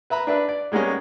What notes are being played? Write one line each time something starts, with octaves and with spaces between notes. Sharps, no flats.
B4 E5 A#5 B5
D4 B4 E5
D5
G3 G#3 A#3 B3 C#4